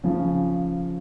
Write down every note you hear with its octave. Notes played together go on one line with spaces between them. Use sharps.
C#3 F3